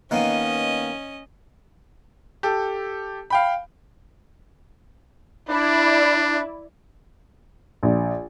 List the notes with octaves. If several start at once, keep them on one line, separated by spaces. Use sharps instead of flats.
D#3 A#3 B3 C#4 D#5
G4 A4
F5 G5 B5
D4 E4 D5
A#1